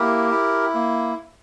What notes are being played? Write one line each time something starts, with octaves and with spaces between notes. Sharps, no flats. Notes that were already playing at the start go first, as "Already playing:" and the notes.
Already playing: A#3 E4 G4 A#4
E4
A#3